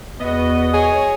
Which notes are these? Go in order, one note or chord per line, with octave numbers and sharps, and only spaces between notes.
E2 B3 F#4 D#5
G#4 C#5